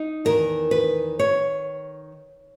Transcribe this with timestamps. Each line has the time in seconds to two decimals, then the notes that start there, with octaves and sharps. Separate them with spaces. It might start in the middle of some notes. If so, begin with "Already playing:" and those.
Already playing: D#4
0.25 E2 D#3 A#4
0.71 B4
1.19 D#3 C#5